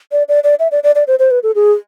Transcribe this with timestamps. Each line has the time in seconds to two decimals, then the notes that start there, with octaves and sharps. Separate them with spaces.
0.12 D5
0.29 D5
0.44 D5
0.59 E5
0.72 D5
0.83 D5
0.95 D5
1.07 C5
1.19 C5
1.31 B4
1.43 A4
1.55 G#4